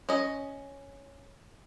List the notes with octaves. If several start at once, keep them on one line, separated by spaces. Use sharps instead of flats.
C#4 D#5